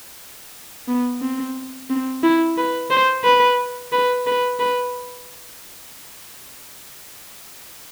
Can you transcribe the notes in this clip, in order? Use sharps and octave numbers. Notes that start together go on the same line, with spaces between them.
B3
C4
C4
E4
B4
C5
B4
B4
B4
B4